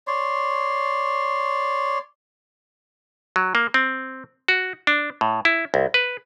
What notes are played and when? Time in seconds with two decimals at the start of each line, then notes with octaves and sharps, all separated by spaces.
0.07 C#5 D5 C6
3.36 F#3
3.55 A#3
3.74 C4
4.48 F#4
4.87 D4
5.21 A2
5.45 E4
5.74 C2
5.94 B4